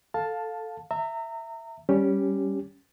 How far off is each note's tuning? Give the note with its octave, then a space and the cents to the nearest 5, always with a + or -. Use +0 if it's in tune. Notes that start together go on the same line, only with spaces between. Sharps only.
A4 +0 F5 +15 A5 +0
E5 +0 A#5 -30
G3 +0 C#4 +0 G4 +0